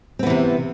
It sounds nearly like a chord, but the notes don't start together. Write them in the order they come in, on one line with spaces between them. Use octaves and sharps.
C4 B3 E3 C3